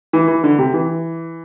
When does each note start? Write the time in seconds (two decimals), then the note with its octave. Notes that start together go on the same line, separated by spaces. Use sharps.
0.13 E3
0.28 E3
0.44 D3
0.58 C3
0.74 E3